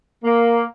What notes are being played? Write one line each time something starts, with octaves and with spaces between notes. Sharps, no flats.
A#3